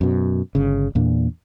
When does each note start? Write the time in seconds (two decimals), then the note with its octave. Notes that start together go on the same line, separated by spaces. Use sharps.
0.01 F#2 B2
0.55 G1 C#3
0.95 E2 A#2 D4